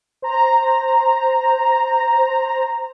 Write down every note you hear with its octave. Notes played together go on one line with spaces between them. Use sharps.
C5 A#5